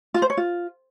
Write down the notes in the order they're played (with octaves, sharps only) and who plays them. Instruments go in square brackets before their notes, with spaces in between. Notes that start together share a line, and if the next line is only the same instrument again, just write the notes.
[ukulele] F4
C5
C#5
F4